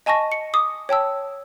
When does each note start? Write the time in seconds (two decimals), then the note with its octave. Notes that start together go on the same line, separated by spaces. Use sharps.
0.06 D#5 G#5 A5 C#6 A#6
0.32 C#7
0.54 D6 D#6
0.89 C#5 G5 A5 E6